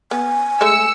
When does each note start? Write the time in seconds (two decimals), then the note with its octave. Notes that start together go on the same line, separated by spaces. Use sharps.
0.11 B3 G#5
0.61 G#3 A3 E6 C#7